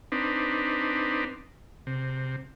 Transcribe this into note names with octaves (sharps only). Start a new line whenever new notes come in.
C4 D4 D#4 B4
C3